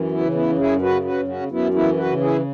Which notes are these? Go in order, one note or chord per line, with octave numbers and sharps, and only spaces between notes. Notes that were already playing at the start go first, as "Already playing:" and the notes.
Already playing: F#2 E3
B3 E4
C#3
B3 E4
F#2
E4 G#4
C#3 F#4 B4
F#4 B4
F#2
C#4 F#4
F#2
B3 E4
E3 B3 E4
F#4 B4
C#3
E4 G#4